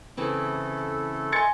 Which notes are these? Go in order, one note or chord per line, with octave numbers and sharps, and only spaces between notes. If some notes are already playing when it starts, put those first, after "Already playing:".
C#3 E3 A3 C4 E4 A4
D#5 G#5 C6 G#6 A6 C#7